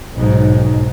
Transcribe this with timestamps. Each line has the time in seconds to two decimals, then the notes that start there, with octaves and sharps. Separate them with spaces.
0.14 B1 G#2